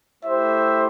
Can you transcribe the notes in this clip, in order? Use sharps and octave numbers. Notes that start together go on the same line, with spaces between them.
A3 E4 G4 C5 E5